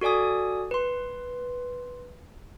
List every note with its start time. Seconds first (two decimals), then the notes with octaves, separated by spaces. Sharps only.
0.01 F#4 A4 D5 G#5 D#6
0.71 B4 C6